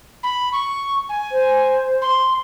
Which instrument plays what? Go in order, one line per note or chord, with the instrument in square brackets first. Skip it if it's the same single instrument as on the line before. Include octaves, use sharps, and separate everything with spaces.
[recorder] B5
C#6
G#5
[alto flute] C5
[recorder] C6